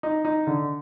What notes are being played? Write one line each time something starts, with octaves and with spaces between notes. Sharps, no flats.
D#4
D#4
D3